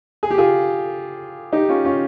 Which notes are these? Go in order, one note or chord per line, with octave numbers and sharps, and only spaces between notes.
G#4
G4
F4 G#4
D#4 G4
C#4 F4
C#4 F4